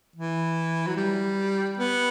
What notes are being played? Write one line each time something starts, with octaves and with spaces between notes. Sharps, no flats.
E3
F#3
G3
B3